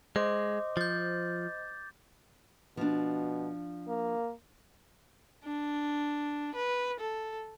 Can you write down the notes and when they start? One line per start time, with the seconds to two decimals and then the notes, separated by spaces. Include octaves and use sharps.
0.16 G#3 C5 D#5 C6 D6
0.77 F3 G6 A6
2.77 B2 F3 D4
3.88 A#3
5.45 D4
6.55 B4
7.00 A4